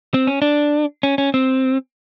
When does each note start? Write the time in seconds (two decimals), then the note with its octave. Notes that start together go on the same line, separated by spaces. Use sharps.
0.14 C4
0.27 C#4
0.42 D4
1.03 C#4
1.18 C#4
1.34 C4